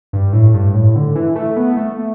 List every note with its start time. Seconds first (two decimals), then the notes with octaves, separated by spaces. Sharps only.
0.13 G2
0.33 A2
0.54 G2
0.74 A2
0.95 D3
1.15 E3
1.35 A3
1.57 B3
1.77 A3